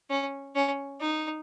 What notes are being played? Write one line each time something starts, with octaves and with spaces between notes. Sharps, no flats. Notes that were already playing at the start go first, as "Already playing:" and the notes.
C#4
C#4
D#4